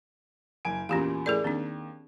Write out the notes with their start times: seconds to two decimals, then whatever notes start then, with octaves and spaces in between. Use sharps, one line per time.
0.65 F#1 G#5 D7
0.89 E2 A#2 C#4 G4 F5
1.26 A2 E3 G#4 A#4 D5
1.44 D#2 C4 D4